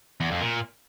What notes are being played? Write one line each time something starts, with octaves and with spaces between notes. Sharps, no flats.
E2
F2
A#2